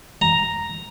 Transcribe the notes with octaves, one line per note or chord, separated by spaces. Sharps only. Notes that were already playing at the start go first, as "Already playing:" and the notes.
A#5